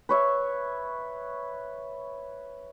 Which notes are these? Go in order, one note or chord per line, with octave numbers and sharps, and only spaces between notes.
B4 C#5 E5